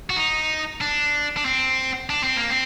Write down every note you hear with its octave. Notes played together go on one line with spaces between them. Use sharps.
F#4
D#4
D4
D4
C4
D4
C4
A#3
C4